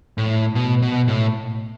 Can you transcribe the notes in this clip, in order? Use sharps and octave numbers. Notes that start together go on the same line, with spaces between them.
A2
B2
B2
A2